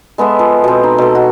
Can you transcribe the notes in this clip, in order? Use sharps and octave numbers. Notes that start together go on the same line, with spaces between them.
G#3 B3 A4 E5
F3
B2 C4
D#4
B2 A4
F#4